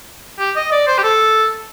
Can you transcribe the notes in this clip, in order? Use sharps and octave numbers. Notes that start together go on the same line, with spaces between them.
G4
D#5
D5
C5
G4
A4